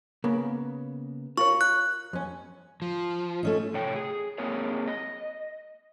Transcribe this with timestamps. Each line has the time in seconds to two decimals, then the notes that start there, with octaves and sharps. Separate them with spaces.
0.24 C#3 A#3 B3
1.38 F4 A#4 C#5 C#6
1.61 F#6
2.13 F2 C#4
2.82 F3
3.43 A3 C#4 D#4
3.74 A2 C3 C#5 G5
3.96 G#4
4.38 A#3 C4 G#4 A#4 C#5
4.88 D#5